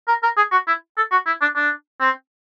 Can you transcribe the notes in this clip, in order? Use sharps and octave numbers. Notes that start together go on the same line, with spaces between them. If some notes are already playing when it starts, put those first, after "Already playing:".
A#4
A#4
G#4
F#4
E4
A4
F#4
E4
D4
D4
C4